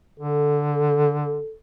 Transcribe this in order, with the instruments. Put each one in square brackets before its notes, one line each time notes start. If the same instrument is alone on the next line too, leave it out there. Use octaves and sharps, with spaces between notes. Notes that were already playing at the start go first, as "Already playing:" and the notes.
[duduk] D3 [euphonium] A4